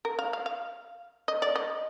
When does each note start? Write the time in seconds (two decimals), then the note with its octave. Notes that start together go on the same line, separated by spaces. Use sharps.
0.05 A#4
0.19 F5
0.33 F5
0.46 F5
1.28 D#5
1.42 D5
1.56 D#5